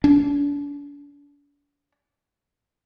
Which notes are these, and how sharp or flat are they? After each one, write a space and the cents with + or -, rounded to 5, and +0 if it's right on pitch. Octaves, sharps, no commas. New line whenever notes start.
D4 -40